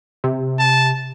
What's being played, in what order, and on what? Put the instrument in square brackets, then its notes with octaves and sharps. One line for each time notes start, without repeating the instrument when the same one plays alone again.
[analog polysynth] C3
[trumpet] A5